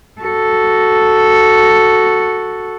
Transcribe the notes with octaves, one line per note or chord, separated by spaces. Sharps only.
F#4 A4